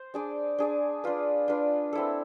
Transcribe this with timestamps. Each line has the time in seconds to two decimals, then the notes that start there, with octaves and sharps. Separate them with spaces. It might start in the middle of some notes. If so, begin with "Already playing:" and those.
Already playing: C5
0.14 D4 G#4 D5
0.58 D4 G#4 D5
1.04 D4 F4 B4
1.48 D4 F4 B4
1.93 C4 E4 A4